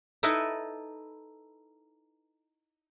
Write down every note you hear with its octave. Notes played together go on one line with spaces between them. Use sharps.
D#4 E4 A4 B4 D#5 E5